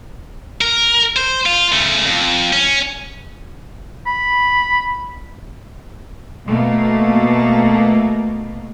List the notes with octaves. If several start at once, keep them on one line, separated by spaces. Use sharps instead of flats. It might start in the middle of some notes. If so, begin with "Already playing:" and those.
A#4
C5
F4
C#3 A3
F2
C#4
B5
B2 A3 A#3